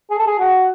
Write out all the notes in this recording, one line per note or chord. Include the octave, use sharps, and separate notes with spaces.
G#4
A4
G#4
F#4